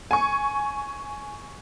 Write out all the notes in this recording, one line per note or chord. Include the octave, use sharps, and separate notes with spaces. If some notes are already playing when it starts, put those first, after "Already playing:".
G#5 C#6